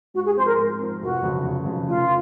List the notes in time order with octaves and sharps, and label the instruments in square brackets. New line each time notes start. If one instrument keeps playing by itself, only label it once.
[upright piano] G#2 [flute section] F#4
[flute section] G#4
[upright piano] F3 C4 [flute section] C5
[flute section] A#4
[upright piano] G#2
F3 C4
[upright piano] F1 [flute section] F#4
[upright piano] F2 C#3 F#3
F1
F2 C#3 F#3
[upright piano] F1 [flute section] F4